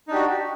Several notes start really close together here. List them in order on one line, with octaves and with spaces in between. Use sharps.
D#4 D4 G4 F#4